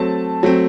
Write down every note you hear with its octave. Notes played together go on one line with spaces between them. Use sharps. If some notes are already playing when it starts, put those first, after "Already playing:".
Already playing: F#3 A3 C4 A5
F#3 A3 C4